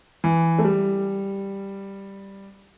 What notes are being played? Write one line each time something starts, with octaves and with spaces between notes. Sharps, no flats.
E3
A3
G3